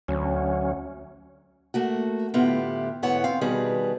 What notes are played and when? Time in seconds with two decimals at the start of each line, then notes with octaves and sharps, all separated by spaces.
0.08 D2 F#3 C#4
1.74 A3 A#3 F#4
2.34 A2 D3 B3 E4 F4 G4
3.02 D2 G#2 B3 E4 C#5 F#5
3.24 D2 C4 F5
3.41 B2 D#3 G3 G#4 B4